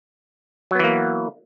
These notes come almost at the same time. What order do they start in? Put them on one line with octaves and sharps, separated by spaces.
F#3 B3 E3 A#3